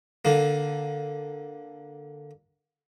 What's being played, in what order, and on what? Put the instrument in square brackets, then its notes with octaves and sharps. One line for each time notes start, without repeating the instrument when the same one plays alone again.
[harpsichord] D3 A#3